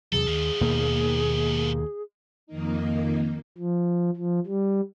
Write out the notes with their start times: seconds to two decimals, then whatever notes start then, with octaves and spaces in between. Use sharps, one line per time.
0.12 E2 C3 F#3 G#4 A4
0.27 D#2 G#2 F3
0.61 D#2 B2 A#3
2.47 F2 D#3 A#3 D#4
3.58 F3
4.16 F3
4.46 G3